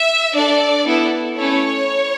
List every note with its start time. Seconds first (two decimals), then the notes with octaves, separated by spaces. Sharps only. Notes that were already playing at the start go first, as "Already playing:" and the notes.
Already playing: E5
0.34 D4 A4 D5
0.85 B3 E4 A4
1.37 A3 C#4 E4 A4 C#5